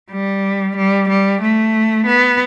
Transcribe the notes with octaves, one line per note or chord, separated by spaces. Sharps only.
G3
G3
G3
A3
B3